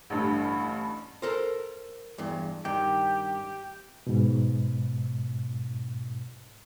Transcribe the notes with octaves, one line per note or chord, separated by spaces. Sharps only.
A1 G2 D3
A4 A#4 C5
E2 G2
G2 D#3 G4
G#2 B2